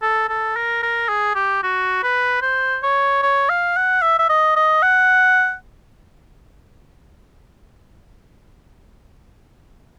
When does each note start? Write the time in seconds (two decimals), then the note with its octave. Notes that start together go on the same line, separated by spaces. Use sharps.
0.02 A4
0.29 A4
0.56 A#4
0.83 A#4
1.09 G#4
1.35 G4
1.63 F#4
2.03 B4
2.42 C5
2.83 C#5
3.22 C#5
3.49 F5
3.76 F#5
4.02 E5
4.19 E5
4.29 D#5
4.56 D#5
4.82 F#5